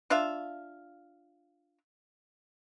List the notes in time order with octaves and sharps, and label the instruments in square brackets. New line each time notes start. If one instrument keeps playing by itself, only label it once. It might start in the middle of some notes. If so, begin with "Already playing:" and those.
[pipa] D4 F4 E5 F5